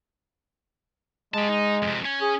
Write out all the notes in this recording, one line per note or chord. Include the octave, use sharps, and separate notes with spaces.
G#3 G4 A5
D#4
F2 C3
C#4 G#5
G#4